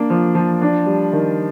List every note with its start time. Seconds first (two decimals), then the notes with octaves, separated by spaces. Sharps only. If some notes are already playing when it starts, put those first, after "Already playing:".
Already playing: A#3 D4
0.10 F3
0.35 F3
0.62 D4
0.86 G3
1.13 D#3